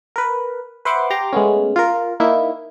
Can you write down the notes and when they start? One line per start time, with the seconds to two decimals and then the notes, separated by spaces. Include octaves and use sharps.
0.16 A#4 B4
0.85 B4 C5 E5 F#5 C6 D6
1.10 G4 A#5 C6 D6
1.33 G#3 A3 B3 C#4
1.76 F4 A#4
2.20 A#3 D#4 E4